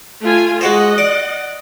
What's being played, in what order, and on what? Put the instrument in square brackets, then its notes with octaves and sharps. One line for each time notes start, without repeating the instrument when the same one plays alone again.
[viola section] A3 F4 G#5
[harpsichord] G#3 F#4 C5 [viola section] D#5 F#5
[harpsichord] D5